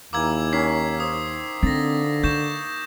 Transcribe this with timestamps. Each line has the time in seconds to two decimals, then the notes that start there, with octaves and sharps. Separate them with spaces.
0.13 D#2 E3 A#3 D6 E6 G#6
0.53 D#3 C#4 G#6 B6 C7
1.00 C5 D#6
1.63 D3 C4 A6 A#6
2.23 D#4 C#6 G6 A#6 E7